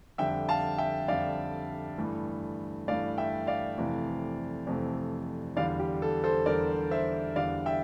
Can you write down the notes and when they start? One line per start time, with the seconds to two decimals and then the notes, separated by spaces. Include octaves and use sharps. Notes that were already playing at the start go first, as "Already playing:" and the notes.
0.18 F2 D3 G3 E5 G5
0.49 F5 A5
0.78 E5 G5
1.08 F2 D3 G3 D5 F5
1.98 G2 E3 A3
2.88 G2 E3 A3 D5 F5
3.18 E5 G5
3.47 D5 F5
3.77 F2 C3 E3 A3
4.67 F2 C3 E3 A3
5.56 E2 D3 G3 D5 F5
5.79 G4
6.02 A4
6.24 A4 C5
6.46 E2 D3 G3 A#4 D5
6.91 C5 E5
7.36 E2 D3 G3 D5 F5
7.66 E5 G5